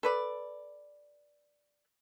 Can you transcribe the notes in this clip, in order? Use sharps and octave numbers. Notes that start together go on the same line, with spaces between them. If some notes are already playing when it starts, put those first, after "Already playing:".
A4 B4 D5